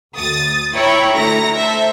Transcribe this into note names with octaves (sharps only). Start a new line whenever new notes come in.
D2 D#6 A6
E4 C#5 G5 A#5 B5 C#6
D2 E4 A#5 A#6 C#7
A4 C5 E5